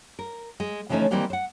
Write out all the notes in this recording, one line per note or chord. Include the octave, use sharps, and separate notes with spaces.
A#4
G#3
C#3 E3 F3 A3 C#4 D#4
D#3 E3 G3 A#3 C4
C5 F#5